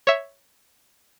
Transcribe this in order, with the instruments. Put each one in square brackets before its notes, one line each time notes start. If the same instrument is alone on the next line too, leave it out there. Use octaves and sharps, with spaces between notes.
[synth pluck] C#5 E5